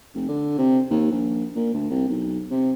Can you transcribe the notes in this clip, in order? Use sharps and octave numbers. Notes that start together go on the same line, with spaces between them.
F1
D3
C3
D#2
A#1
A#2
D2
C2
B1
C3